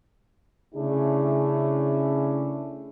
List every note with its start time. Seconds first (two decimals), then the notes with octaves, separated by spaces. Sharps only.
0.75 C#3 A3 C#4 D4 E4 G#4